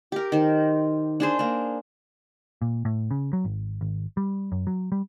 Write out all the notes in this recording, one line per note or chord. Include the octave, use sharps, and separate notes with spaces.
G4 A#4
D#3 C5
D4 G#4 C5
A#3 D4
A#2
A2
C#3
F#3
G#1
G#1
G3
F#2
F#3
G3